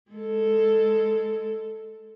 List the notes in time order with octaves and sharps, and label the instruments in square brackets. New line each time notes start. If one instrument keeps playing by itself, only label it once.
[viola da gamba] G#3 A4